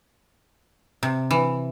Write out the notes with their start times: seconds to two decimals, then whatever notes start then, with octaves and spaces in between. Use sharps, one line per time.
1.03 C3
1.31 E3